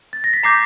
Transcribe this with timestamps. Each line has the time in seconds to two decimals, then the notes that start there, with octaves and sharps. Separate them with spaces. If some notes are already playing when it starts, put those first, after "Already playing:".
0.13 A6
0.24 A#6
0.33 B6
0.43 A#5 D6 G6 A#6 C7